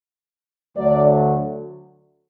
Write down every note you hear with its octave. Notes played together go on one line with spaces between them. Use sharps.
D2 D3 F#3 A3 D5